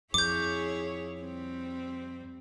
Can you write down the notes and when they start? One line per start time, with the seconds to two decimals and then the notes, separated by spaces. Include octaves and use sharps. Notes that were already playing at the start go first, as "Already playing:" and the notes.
0.14 F2 E4 G#4 C#5 D6 G6
1.21 G3 C4